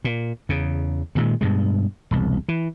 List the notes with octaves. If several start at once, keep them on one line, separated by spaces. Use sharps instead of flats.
A#2
E2 C#3
G2 A#2 D#3 G#3
G2 B2 G#3
E1 C2
E3